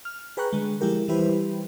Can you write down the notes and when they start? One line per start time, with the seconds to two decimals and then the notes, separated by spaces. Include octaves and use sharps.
0.05 F6
0.37 G#4 B4 G5 A#5 C#6 F#6
0.53 D3 G#3
0.81 F3 G#3 E4 G4 A#4
1.08 E3 G3 E4 G4 B4 C5